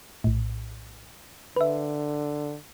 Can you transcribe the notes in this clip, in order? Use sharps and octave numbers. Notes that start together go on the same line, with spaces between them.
A#1 A2
D3 B4 E5